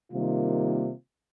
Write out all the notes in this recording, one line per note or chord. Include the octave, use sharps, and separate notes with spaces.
C3 D#3 G3 A#3 F4